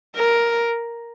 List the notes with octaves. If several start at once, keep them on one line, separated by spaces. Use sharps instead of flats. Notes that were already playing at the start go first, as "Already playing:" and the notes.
A#4